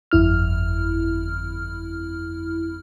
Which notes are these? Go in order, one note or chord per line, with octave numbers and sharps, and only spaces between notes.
G1 F2 E4 F6